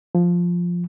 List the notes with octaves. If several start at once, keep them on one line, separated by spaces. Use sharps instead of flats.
F3